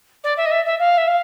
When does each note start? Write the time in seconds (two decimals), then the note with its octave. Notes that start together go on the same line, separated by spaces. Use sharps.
0.24 D5
0.37 E5
0.46 D#5
0.51 E5
0.65 E5
0.79 F5
0.97 E5
1.07 F5